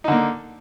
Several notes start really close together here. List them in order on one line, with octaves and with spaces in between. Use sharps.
D#4 D3 A#3